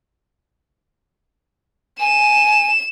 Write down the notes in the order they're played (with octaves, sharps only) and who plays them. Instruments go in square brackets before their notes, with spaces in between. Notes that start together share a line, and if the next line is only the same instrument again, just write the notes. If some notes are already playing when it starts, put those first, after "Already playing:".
[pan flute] G#5 [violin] E7